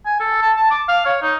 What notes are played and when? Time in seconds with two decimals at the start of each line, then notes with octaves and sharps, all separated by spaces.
0.06 G#5
0.20 A4
0.42 A5
0.57 A5
0.71 D6
0.88 F5
1.05 C#5
1.22 D#4